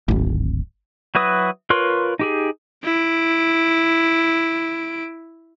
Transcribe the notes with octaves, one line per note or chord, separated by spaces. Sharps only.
D1 G#1
F#3 E4 F#4 B4 D#6
F4 A#4 B4 C#5 C6
D#4 G4 G#4
E4 D7